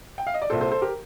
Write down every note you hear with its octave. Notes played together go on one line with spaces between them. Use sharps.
G5
F5
D#5
D5
C2 A#2 A4 C5
A4 C5
A4 C5
G4 A#4